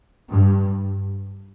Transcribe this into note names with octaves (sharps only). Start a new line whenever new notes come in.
G2